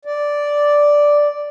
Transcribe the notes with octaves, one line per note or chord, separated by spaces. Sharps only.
D5